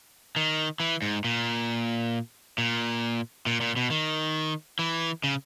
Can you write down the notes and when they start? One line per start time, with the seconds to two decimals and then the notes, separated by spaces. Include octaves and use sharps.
0.36 D#3
0.80 E3
1.02 G#2
1.24 A#2
2.58 A#2
3.46 A#2
3.61 A#2
3.76 B2
3.90 D#3
4.79 E3
5.24 C#3